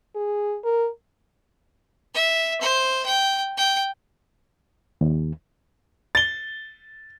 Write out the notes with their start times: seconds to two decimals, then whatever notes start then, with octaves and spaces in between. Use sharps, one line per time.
0.16 G#4
0.64 A#4
2.14 E5
2.61 C5
3.06 G5
3.57 G5
5.01 D#2
6.15 A6 G7